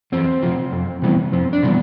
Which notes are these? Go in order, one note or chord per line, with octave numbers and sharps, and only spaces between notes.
E2 C4
C3 F3
F2
C3 E3 G3 B3
F2 C4
D4
C3 E3 G3 B3